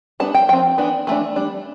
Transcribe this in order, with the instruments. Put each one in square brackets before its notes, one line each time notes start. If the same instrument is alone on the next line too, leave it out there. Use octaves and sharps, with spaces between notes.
[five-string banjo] G3 B3 D4 A5
G5
F3 C4 G5
E3 B3 D4
E3 A3 D4
G3 D4